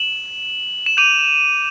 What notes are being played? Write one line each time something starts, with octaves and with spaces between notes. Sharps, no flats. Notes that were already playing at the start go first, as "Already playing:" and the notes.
Already playing: E7 F#7
E7
D6 G6 D#7 F7